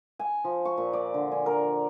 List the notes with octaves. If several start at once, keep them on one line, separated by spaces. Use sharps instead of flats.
G#5
F3
C#6
A#2
D5
D3
G#5
A#4